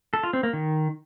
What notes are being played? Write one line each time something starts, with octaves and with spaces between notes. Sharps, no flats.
A4
F4
C4
A#3
D#3